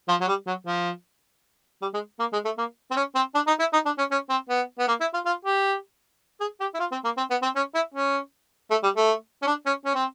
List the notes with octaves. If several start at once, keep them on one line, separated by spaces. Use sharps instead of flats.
F3
F#3
G3
F#3
F3
G3
G#3
A#3
G#3
A3
A#3
C4
C#4
C4
D4
D#4
E4
D#4
D4
C#4
C#4
C4
B3
B3
A#3
E4
F4
F4
G4
G#4
G4
E4
F4
C4
A#3
C4
B3
C4
C#4
E4
C#4
A3
G3
A3
C#4
D4
C#4
C#4
C4